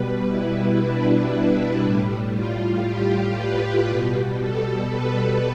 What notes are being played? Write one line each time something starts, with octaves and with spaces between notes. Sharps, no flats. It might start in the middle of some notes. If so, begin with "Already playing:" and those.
Already playing: B2 G3 B4
E4
D4
A2 G3
F4
G4
B4
B2 G3
A4
B4